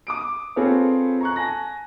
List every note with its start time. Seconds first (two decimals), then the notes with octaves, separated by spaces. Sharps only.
0.07 D6 D#6 D7
0.56 C4 F4 G#4 A4 B4 C#5
1.21 A#5 C#6 F#6
1.36 G#5 A5 A#6